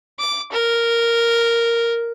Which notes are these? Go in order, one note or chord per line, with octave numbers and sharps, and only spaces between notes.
D6
A#4